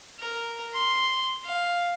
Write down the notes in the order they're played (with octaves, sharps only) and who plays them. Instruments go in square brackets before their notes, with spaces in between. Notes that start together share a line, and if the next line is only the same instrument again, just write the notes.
[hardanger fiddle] A#4
C6
F5